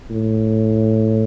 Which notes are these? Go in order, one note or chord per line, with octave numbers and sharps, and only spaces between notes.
A2